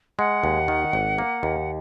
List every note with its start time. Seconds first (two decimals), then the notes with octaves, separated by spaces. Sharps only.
0.19 G#3 F#5
0.44 D#2
0.68 D#3
0.93 G#1
1.18 A#3
1.43 D#2